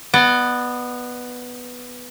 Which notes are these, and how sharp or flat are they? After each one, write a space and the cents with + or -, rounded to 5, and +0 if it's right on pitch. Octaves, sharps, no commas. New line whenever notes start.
B3 +0 D5 +40